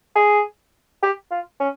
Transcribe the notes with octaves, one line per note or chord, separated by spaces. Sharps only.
G#4
G4
F4
C#4